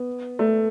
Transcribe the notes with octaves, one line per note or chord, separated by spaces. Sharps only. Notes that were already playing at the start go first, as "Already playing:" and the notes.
Already playing: B3
A3